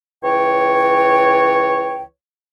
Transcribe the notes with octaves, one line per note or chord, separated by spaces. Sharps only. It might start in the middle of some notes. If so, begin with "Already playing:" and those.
C#2 E3 C#5 G5